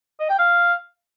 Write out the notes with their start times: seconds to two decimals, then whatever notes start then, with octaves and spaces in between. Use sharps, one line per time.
0.20 D#5
0.29 G5
0.39 F5